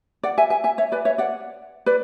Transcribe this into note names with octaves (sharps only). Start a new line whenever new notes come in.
D5 F#5
E5 G#5
E5 G#5
E5 G#5
C#5 E5
B4 D5
C#5 E5
D5 F#5
B4 D5